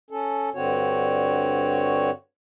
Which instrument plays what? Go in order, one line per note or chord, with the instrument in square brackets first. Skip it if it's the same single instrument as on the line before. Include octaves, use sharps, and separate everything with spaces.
[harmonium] C#4 A4
G2 D3 C4 F#4 C#5